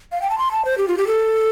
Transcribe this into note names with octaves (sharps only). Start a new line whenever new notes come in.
F5
G5
A5
C6
A5
C5
G4
F4
G4
A4